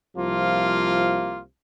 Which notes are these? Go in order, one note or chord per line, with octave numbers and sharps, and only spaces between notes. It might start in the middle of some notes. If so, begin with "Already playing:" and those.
C2 C3 F3 A#3 F4